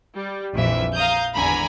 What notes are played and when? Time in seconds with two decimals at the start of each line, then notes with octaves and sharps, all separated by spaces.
0.16 G3
0.53 A#1 F2 E3 E5
0.95 F5 A#5 D#6 G6
1.34 G#1 E2 D3 G#5 A#5 B5